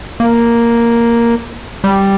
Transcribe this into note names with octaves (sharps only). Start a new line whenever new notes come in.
A#3
G3